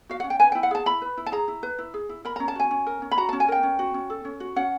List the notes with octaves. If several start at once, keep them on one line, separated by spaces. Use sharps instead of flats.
F#4 F5
C#4 F#5
G5
B4 G#5
G5
E4
F#5
G#4 A5
E4 B5
B4
E4
A5
G#4 A#5
E4
B4
E4
G#4
E4
A#4 B5
A#5
C#4
A5
F#4 G#5
C#4
A#4
C#4
B5
F#4 A#5
A5
C#4
G#5
A#4 G5
C#4
F#4
C#4
A4
C#4
F#4
C#4 F#5